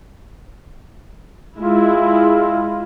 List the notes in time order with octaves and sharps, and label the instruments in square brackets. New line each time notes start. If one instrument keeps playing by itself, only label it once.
[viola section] G#3 E4 [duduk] F4